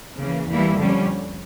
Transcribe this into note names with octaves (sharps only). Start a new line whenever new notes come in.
C#3 E3 A#3
E2 E3 G3 A#3 E4
F2 D3 G3 C#4